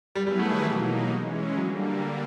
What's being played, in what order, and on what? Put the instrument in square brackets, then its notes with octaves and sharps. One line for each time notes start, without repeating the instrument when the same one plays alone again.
[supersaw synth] F#3 B3 E4 G#4 B4 [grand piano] G3
[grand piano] G3
A3
D#3
[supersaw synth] B2 F#3 A#3 D#4 [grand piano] E3
[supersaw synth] E3 G#3 C#4
[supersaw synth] D3 G3 A#3 [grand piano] F#3